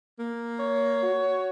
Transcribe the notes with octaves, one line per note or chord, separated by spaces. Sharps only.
A#3
C#5
F#4